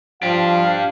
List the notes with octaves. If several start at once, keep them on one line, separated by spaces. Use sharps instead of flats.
F3 D4 G4 F5